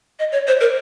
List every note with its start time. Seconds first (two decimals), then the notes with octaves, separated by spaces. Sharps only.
0.19 D#5
0.32 C#5
0.47 C5
0.61 A#4